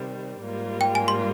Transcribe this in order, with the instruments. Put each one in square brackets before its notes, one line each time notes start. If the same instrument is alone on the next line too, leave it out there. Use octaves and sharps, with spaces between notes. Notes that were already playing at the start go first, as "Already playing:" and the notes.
Already playing: [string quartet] C3 D#3 G3 C4
G#2 G3 A#3 F4
[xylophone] G5
G#5
C6